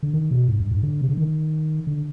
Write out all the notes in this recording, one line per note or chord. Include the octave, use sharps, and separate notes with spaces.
D3
D#3
B2
G#2
G2
G#2
D3
C3
D3
D#3
D3